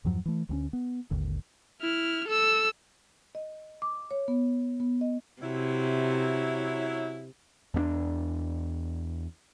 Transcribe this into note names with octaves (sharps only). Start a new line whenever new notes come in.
E2 G2 F3 F#3
E3 A3
D2 G3 C#4
B3
G#1 D#2 D3
E4 F6
A4 E6
D#5
D6
C#5
B3
B3
D#5
C3 F#3 C#4 E4
E2 B3 D4